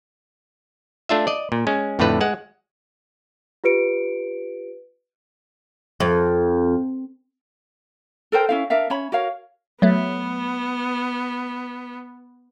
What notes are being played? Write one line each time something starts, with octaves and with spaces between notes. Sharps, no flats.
A3 D4 F4 E5
D5 D#5
A#2
G#3 C#4
F2 A2 D3 A3 B4
G#3 F#5
F4 G4 B4 C#7 D7
F2
A4 A#4 C5 G5
C#4 E4 F5
D4 A#4 E5 F5
C#4 C#5 B5
F#4 A#4 C#5 F5
F#3 A3 B3